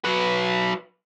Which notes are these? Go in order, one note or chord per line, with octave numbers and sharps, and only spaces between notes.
F#3 B4